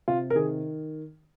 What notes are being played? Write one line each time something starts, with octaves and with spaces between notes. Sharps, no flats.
C3 F4
A#4
D#3 G#4